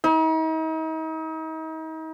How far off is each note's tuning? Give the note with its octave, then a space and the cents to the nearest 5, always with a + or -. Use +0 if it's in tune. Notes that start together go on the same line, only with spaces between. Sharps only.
D#4 +40